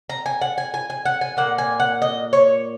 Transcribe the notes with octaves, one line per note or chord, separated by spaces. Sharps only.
A#5
G#5
F#5
G#5
G#5
G#5
F#5
G#5
A#2 A#3 F#5
G#5
F#5
D#5
C#5